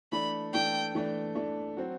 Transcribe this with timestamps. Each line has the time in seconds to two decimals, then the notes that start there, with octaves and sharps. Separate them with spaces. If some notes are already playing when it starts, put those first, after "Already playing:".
0.12 E3 A3 D4 B5
0.53 E3 A3 D4 G5
0.95 E3 A3 D4
1.35 E3 A3 D4
1.77 F#3 C4 F#4